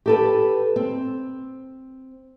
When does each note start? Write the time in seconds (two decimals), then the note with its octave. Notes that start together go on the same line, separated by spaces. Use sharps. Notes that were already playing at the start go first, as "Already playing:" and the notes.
0.06 G4 A4 B4
0.76 C4